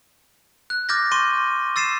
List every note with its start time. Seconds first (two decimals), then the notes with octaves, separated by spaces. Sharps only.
0.70 F#6
0.89 D6 F6 G6 A6 A#6
1.12 C6 C#6 D#7
1.76 E6 A6 C7 D#7 E7